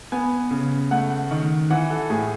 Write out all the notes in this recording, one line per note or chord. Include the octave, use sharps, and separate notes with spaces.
B3 G#5
C#3
A3 F#5
D#3
E3 F#5
A4
A2 G#4